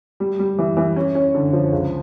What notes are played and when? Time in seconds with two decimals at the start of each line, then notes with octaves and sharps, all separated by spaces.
0.20 G3
0.39 G3
0.59 E3
0.77 E3
0.96 C#4
1.15 C#4
1.35 D3
1.53 F3
1.73 C#2